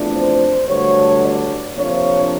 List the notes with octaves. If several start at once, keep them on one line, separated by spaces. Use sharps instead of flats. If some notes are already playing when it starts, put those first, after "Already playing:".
Already playing: E2 C3 F3 A3 D4
C5
G2 D3 F#3 A3 C#5
D5
C3 F3 A#3 D4 C#5